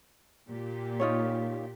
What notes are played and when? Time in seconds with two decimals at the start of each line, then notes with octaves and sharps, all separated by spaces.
0.50 A#2 G4
1.00 D#4 F4 C#5